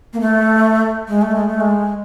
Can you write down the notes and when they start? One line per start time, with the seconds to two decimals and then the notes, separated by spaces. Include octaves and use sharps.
0.13 A#3
0.20 A3
1.08 G#3
1.22 A3
1.35 G#3
1.48 A3
1.61 G#3